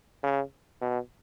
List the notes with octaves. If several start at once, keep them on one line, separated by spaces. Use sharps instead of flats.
C#3
B2